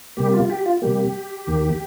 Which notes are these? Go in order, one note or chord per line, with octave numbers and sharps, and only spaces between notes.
C3 G3 A#3 G4
F4
F4
G4
F4
C3 G3 A#3 G4
D#2 D#3 A#3